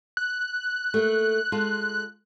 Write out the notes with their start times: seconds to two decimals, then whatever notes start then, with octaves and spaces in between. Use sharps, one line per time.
0.17 F#6
0.94 A3 A#3
1.52 G#3 F4 A4